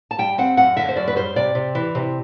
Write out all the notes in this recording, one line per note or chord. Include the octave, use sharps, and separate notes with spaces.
A5
G3 G5
C4 F#5
F#2 F#5
D3 E5
C5
F#2 D5
B4
G3 C5
C3 D5
C3
E3
C3